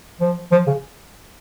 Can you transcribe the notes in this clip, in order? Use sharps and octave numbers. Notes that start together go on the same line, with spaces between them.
F3
F3
C#3